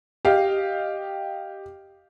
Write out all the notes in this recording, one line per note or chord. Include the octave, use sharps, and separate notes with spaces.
G4 D#5 F5